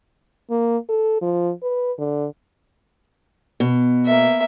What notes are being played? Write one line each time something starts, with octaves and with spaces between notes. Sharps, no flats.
A#3
A4
F3
B4
D3
B2
A#3 E5